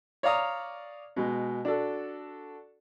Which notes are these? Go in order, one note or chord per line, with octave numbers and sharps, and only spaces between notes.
C#5 D5 F5 A#5 D#6
B2 G#3
D4 F#4 A4